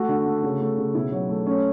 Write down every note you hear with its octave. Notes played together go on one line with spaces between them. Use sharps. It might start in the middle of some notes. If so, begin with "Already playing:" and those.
Already playing: A3 F#4
D3
A3
C#3
A3
C#3
B2 E4
F#3
A3
A3 C#4